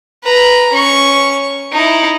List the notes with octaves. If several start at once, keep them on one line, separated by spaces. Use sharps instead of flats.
B4 A#5
C#4 C#6
D#4 E4